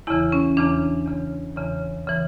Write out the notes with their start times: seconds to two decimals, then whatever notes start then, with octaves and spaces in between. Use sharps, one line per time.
0.07 E2 C#3 E3 E4
0.32 C#4
0.57 E2 C#3 E3 D4
1.06 E2 C#3 E3
1.56 E2 C#3 E3
2.07 C#3 E3